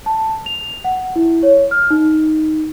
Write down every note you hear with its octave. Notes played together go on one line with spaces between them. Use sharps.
A5
F7
F#5
E4
C#5
F6
D#4